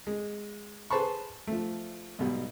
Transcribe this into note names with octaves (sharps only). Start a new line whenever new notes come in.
G#3
G#4 B4 C5 A5 B5 C#6
F3 A3
B1 G#2 B2 G3